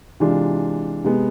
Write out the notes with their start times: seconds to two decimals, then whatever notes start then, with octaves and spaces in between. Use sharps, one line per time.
0.20 C3 E3 G#3 D4 F4
1.05 C3 G#3 B3